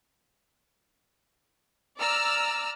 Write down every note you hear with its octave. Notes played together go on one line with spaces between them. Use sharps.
D5 A#5 E6 F6